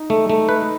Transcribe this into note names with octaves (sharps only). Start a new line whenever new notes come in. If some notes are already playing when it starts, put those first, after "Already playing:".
Already playing: D#4
A3
A3
B4